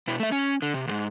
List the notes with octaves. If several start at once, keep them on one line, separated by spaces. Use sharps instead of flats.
B2 E4
A3 E5
C#4
D3
C3
D2 G#2